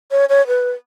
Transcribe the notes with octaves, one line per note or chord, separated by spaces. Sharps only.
C#5
C#5
B4